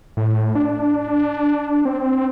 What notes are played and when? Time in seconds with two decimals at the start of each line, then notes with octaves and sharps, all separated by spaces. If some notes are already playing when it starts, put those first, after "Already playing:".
0.17 A2
0.55 D4
1.85 C4